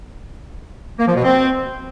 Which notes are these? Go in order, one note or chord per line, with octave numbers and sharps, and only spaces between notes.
A#3
F3
B2
C4